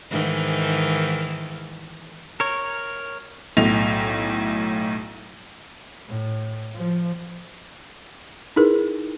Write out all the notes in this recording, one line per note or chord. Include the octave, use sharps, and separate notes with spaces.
G#2 D#3 E3
A#4 C#5
B1 A2 F7
A2
F3
D#4 E4 G#4 A#4 B4